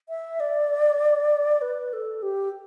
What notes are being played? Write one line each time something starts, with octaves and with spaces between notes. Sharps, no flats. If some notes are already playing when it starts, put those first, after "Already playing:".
E5
D5
B4
A4
G4